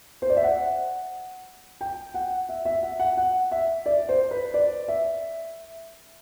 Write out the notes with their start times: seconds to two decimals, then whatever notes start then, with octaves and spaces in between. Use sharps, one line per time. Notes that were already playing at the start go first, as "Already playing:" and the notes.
0.22 C5
0.30 D5
0.37 E5
0.44 F#5
1.81 G5
2.14 F#5
2.49 E5
2.65 E5
2.83 F#5
3.00 F#5
3.17 F#5
3.51 E5
3.86 D5
4.09 C5
4.31 B4
4.54 D5
4.88 E5